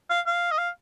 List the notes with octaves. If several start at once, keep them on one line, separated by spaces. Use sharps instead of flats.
F5
F5
D#5
F5